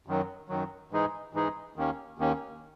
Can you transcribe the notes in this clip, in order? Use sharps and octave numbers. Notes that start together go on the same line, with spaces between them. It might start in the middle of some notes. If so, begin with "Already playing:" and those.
F#2 D#3 F#3
F#2 D#3 F#3
G#2 E3 G#3 D#4 G#4
G#2 E3 G#3 D#4 G#4
D#2 D#3 A#3 C#4
D#2 D#3 A#3 C#4